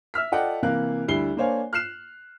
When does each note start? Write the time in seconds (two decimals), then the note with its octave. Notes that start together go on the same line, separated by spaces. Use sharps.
0.14 E5 E6 F6 B6
0.32 F4 A4 D5 D#5 F#5 G5
0.62 C3 E3 A#3 A#4 F5 F#6
1.08 D2 G3 E4 C7 G7
1.37 A#3 D4 C5 C#5 F5 G#5
1.73 F6 F#6 C7 E7